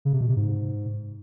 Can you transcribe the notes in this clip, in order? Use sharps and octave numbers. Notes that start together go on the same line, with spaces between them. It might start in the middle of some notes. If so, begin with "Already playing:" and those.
C#3
C3
B2
C3
G#2